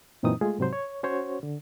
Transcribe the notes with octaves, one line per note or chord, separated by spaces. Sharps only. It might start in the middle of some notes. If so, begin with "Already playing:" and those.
F#2 A#2 E3 C4 D#4 D#6
G#3 A3 F4 G#4
G#2 C3 F#3 C5
C#5
C#4 F#4 C5 C#5
D3